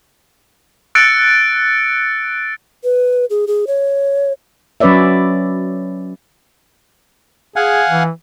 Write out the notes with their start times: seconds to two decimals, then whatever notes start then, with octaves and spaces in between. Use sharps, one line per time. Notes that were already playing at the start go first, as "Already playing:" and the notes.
0.95 E6 F#6 A6 C#7 D7
2.84 B4
3.30 G#4
3.47 G#4
3.67 C#5
4.80 F#3 C#4 B4 C#5 D5 E5
7.56 G#4 F5 F#5 G#5
7.89 E3